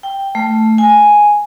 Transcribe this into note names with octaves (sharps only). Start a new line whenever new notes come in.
G5
A3
G#5